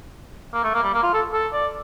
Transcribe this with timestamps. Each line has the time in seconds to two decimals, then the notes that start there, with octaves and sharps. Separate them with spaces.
0.54 A#3
0.64 A3
0.74 A#3
0.83 G3
0.94 A#3
1.03 F4
1.14 A4
1.34 A4
1.53 D5